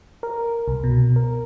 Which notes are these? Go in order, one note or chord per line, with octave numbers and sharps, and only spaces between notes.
A#4
C2
B2
A#4